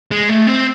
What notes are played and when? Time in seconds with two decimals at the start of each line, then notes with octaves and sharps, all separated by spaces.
0.11 G#3
0.29 A3
0.47 C4